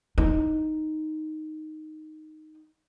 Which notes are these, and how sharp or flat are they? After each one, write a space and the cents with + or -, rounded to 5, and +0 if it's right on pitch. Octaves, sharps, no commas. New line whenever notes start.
D#4 +0